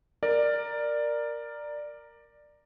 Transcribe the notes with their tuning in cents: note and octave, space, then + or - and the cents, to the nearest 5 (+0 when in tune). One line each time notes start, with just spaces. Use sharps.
A#4 +0 D5 +10